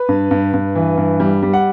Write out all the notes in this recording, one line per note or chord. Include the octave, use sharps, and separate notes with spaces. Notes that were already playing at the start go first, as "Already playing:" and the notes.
Already playing: B4
G2
G2
G2
E3
G2
G3
G3
F#5